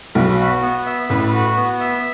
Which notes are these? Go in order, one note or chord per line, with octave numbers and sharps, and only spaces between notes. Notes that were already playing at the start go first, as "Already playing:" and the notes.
B1 B2 B4
F#4
B3
E5
A1 A2 B4
F#4
B3
E5